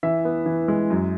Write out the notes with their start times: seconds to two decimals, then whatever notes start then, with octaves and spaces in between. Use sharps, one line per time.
0.03 E3 E5
0.25 B3
0.46 E3
0.68 G#3
0.90 F#2